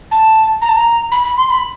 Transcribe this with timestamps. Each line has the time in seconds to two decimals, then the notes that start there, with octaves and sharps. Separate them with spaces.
0.11 A5
0.61 A#5
0.68 A5
0.75 A#5
1.11 B5
1.24 B5
1.36 C6
1.49 B5